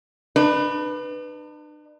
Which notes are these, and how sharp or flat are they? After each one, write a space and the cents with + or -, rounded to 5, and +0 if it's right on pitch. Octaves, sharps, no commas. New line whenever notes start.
D4 +45 B4 +0